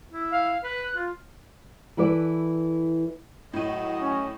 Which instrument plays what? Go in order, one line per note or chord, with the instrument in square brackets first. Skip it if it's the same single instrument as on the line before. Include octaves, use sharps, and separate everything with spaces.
[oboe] E4
[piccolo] F5
[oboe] B4 [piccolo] F#6
[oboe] F4
[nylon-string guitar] E3 E4 A4 B4 D5
[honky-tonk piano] A2 D#7 [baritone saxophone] F#3 [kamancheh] D#5
[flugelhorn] C#4